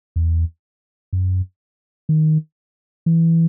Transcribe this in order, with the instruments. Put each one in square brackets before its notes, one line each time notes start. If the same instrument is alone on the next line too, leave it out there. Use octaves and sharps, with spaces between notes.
[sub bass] E2
F#2
D#3
E3